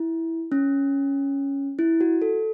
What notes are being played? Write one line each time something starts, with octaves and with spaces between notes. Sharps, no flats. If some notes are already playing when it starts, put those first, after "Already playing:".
Already playing: E4
C#4
E4
F#4
A4